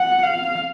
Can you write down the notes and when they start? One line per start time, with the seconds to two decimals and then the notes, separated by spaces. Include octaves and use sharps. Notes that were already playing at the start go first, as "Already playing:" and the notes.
Already playing: F#5
0.23 F5